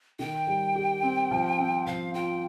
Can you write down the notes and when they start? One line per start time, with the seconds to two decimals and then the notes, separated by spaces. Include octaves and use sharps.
0.19 D#3 G5
0.47 G3
0.76 G4
1.02 C4
1.31 F3
1.59 C4
1.86 F3 F5
2.14 F4 G5